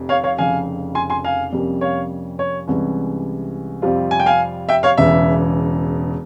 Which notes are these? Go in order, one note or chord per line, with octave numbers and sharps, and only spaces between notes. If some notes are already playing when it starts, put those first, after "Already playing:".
Already playing: F1 F2 C3
C#5 F5
C#5 F5
F1 F2 C#3 F5 G#5
G#5 C6
G#5 C6
F5 G#5
F2 C3 G3 A#3 C#4
C#5 F5
C#5
C2 C3 E3 G#3 C#4
F2 C3 G3 C4 F4
G#5
G5
F5 G#5
E5 G5
C#5 F5
E1 E2 C#3 E3 E5